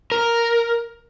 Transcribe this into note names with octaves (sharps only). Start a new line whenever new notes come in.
A#4